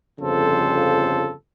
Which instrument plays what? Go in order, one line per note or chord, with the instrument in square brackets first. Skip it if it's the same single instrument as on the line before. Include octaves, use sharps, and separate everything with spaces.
[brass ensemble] G1 F2 C#3 F3 A4 C5